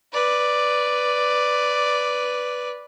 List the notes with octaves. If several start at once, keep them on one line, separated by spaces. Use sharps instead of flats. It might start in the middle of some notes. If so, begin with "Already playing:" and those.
B4 D5